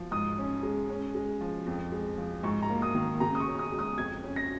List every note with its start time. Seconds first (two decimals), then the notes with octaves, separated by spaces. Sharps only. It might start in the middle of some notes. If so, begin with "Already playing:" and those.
Already playing: F3
0.11 G#2 D#6
0.38 C#4
0.63 G#3
0.90 C#4
1.15 G#3
1.41 F3
1.66 F2
1.92 G#3
2.18 F3
2.43 G#2 C#6
2.62 A#5
2.70 A#3
2.82 D#6
2.95 D#3
3.20 C#3 A#5
3.35 D#6
3.40 C#6
3.47 C#4
3.59 D#6
3.72 G#3
3.79 D#6
3.98 F2 G#6
4.23 C#4
4.36 A#6